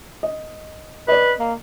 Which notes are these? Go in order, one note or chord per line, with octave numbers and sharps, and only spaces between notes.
D#5
B4 D5 D#5
A#3